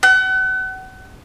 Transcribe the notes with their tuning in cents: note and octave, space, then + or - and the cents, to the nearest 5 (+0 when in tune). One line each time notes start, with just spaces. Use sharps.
F#5 +35